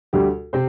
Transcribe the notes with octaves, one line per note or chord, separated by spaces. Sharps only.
D2 G3 G4
C3 C4 C5